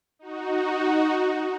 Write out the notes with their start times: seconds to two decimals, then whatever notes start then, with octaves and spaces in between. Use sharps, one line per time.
0.19 D#4 F#4